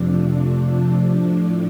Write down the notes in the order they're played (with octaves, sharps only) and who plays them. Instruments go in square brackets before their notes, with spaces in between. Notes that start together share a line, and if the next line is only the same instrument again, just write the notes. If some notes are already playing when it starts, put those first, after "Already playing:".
Already playing: [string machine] F2 C3 F3 A3 D4
D4
A2 F3 A3